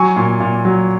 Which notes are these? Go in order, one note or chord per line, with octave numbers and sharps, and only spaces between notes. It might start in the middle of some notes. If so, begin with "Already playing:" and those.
Already playing: F#3 G#5 C#6
A#2
A#2
F#3